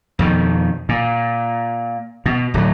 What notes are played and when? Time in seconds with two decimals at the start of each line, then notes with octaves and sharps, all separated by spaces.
0.19 F2 B2 D#3
0.89 A#2
2.26 B2
2.54 D1 F#3